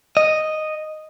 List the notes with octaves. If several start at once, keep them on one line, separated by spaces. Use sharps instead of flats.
D#5